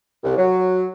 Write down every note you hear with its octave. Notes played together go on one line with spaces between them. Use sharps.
C2
F#3